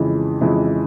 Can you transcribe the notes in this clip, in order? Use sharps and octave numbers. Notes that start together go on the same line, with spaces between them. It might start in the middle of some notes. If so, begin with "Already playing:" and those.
Already playing: F2 C#3 E3 G#3 E4
F2 C#3 E3 G#3 E4